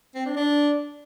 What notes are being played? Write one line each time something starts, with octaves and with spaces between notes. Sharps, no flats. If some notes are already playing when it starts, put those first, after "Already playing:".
C4
D4
D4